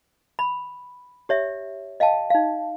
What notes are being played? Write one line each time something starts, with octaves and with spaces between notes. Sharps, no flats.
B5
G4 C#5 E5
D#5 F5 G5 A5
D#4 F5